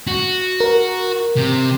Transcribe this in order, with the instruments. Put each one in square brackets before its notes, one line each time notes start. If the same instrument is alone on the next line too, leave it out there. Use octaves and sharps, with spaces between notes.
[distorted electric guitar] F#4
[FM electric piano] A#4
[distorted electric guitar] C3